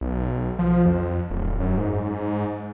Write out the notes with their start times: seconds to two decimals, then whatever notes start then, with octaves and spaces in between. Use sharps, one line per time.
0.01 B1
0.59 F3
0.86 F2
1.30 D1
1.60 F#2
1.77 G#2